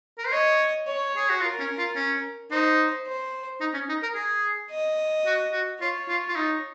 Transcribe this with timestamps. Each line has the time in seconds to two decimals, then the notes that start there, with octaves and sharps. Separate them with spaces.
0.18 A#4
0.25 C5
0.32 C#5 D#5
0.87 C#5
1.16 G#4
1.30 F#4
1.41 F4 A#4
1.59 C#4
1.78 F4
1.96 C#4
2.51 D#4 C5
3.07 C5
3.61 D#4
3.74 C#4
3.89 D#4
4.02 A#4
4.15 G#4
4.71 D#5
5.26 F#4
5.52 F#4
5.80 F4 C#5
6.08 F4
6.29 F4
6.36 D#4